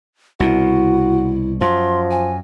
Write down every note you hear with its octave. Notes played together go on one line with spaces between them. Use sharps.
C2 B2 E4 F#4
F#2 F3 C6
G#5